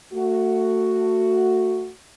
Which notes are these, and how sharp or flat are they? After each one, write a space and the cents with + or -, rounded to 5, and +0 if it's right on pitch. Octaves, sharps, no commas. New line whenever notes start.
A3 +25 F#4 +0